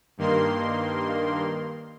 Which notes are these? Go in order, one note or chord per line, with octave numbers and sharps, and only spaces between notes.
G2 D#3 A#3 C6